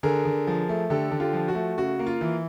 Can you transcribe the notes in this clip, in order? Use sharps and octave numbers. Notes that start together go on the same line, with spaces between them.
D3 G#4 A#4
D3
F3
A3
D3 G4 A4
D3
F4 G4
F3
F#4
A3
C#3 F#4
A#3
F4
E3